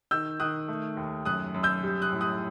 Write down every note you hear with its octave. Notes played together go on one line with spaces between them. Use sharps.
D#3 E6 G6
D#3 D#6 F#6
A3
D#2
F#2 D#6 F#6
F#2
E6 G6
G3
D#6 F#6
A2
D#6 F#6